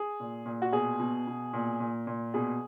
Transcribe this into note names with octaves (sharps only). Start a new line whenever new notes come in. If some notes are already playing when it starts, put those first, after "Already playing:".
Already playing: G#4
A#2
A#2
F#4
B2 G#4
B2
B2
A#2
A#2
A#2
B2 G#4